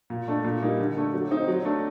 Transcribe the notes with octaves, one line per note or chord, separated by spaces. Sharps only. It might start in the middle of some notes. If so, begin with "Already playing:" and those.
A#2
A3 D4
A#2
G3 A#3 D#4
D3
A3 D4
F#3
C4 D#4
F#3
A3 D4